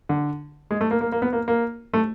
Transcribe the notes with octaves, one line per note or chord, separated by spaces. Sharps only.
D3
G#3
A3
A#3
A#3
A#3
B3
A#3
A#3
A3